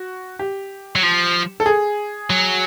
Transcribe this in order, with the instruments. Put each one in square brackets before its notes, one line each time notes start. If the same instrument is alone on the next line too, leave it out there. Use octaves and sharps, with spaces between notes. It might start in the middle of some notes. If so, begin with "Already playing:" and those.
Already playing: [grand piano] F#4
G4
[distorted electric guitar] F#3
F3
[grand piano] A4
G#4
[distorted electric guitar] F#3